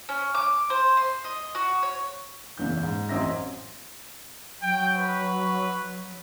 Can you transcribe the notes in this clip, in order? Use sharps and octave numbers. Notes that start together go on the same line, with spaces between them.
C#4
D6
C5
C6
D#5
F#4
C#5
F#1 E2 C#3 E3 E4 G6
G#2
A1 F#2 C4 D#5 E5 A#6
F#3 G5
B4